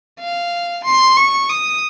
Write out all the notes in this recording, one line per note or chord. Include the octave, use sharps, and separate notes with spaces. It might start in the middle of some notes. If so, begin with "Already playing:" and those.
F5
C6
C#6
D#6